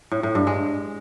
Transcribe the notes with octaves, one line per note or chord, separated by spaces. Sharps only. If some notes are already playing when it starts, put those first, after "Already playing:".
A2
A2
G2
G#3